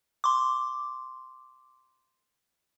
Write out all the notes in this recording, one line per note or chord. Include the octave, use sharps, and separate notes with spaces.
C6 D6